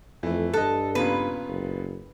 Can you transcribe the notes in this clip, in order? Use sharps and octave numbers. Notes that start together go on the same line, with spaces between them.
F2 E3 A3
G2 A4 D#5 F#6
A#2 C#3 B3 B4
F#1